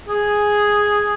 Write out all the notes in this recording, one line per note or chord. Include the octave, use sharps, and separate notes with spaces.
G#4